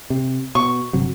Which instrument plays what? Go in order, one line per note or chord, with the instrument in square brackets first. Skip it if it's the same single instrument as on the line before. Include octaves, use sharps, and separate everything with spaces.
[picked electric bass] C3
[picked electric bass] B2 [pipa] C#6
[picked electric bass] G1 C3 F#3